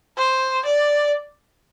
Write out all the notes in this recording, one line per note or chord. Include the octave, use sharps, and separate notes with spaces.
C5
D5